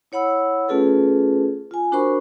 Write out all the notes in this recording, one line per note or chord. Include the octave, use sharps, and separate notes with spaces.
E4 C#5 F#5 B5 E6
A3 C#4 F4 G#4 A4 B4
F4 G#5
D4 F#4 A#4 C5 B5 C#6